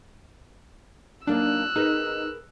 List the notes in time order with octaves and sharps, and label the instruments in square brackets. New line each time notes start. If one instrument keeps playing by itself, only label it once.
[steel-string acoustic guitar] F#3 A#3 D#4 [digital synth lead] D4 [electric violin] E6 F#6
[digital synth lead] D#4 [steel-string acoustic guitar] G#4 A#4 B4